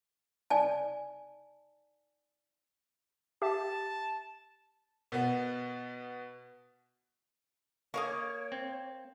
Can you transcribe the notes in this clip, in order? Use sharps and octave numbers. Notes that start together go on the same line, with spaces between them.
D5 G#5 A5
G4 E5 A5
B2 B3
A#3 C#5 D#5 F5 C#6
C4